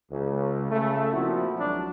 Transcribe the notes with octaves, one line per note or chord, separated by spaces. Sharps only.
C#2
C#3 A3
A#2 F3 C4 E4 F#4
G#1 F#3 D4